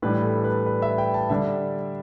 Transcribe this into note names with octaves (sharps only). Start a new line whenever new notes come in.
A2 E3 G3 D4 B4
A4
B4
B4
E5
G5
A5
D3 G3 D4 E5